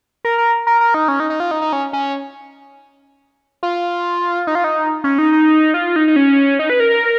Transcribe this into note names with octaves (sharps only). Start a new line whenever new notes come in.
A#4
A#4
A#4
A#4
D#4
C#4
D#4
D#4
F4
D#4
D#4
C#4
C#4
F4
D#4
F4
D#4
C#4
D#4
D#4
F4
D#4
D#4
C#4
D#4
B4
A#4
A#4